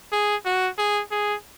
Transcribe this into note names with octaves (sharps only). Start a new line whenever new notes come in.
G#4
F#4
G#4
G#4